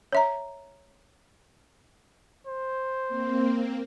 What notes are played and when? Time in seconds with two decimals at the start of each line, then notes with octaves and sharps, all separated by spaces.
0.12 C#5 E5 A#5
2.47 C5
3.08 A#3 C4